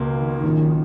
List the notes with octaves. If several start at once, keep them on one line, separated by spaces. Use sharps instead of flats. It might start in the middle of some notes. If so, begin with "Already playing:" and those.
Already playing: C#2 B2 A#3
D#3
A#1 A#2 F#3 C#4